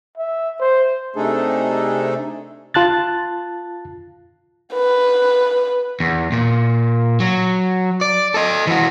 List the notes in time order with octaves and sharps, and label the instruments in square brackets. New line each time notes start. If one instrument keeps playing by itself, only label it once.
[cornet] E5
C5
[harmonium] C3 A3 D4 D#4 G#4 A4
[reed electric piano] F4 A5 F#6 A6
[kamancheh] B4
[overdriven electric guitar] E2
A#2
F#3
D5
A4 D#5
E3 F#4